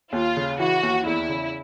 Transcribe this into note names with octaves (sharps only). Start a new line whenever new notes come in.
D#2 F4
C#3
E3 F#4
D#2
E2 E4
C#3